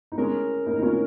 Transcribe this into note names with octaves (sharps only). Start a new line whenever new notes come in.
D#4
G#3 C#4 A#4
A#3 D#4
D#4
C#4 F4